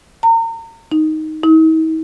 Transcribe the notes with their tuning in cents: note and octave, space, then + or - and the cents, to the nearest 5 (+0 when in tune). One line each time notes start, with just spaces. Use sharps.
A#5 -35
D#4 +5
D#4 +45